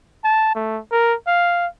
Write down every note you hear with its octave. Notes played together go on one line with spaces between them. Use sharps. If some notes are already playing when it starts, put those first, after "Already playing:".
A5
A3
A#4
F5